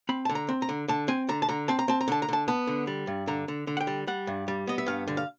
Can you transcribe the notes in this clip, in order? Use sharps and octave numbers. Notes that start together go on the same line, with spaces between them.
C4 B5
D3 A5
A#5
C4
A#5
D3
D3 A5
C4 G#5
D3 A#5
A5
D3 A#5
C4 A5
A#5
C4 A5
A#5
D3 A5
A#5
D3 A5
B3 A5
D3
G3
G2
D3 A#5
D3
D3
F#5
G5
G3
G3 F#5
G2
G3
B3 D#5
E5
G2 F5
D3
F5